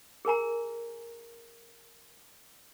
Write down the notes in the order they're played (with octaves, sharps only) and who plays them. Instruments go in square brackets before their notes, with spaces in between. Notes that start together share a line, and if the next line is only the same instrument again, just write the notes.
[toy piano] G#4 A#4 G#5 A#5